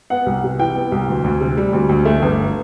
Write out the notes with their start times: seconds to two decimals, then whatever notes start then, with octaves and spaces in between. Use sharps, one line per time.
0.10 B3 F#5
0.26 C2
0.44 C3
0.59 E3 G5
0.76 B3
0.92 C2
1.08 D2
1.24 D2
1.41 C3
1.57 G3
1.73 D2
1.89 D2
2.05 A3
2.22 G1